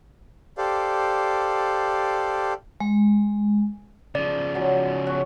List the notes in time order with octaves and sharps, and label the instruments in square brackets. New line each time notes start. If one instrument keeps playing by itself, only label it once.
[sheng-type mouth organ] G4 A4 C5 D5 F5
[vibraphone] G#3
[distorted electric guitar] C#3 F3 [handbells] D5
[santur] F#3 G#3
C#5 F#5 C#6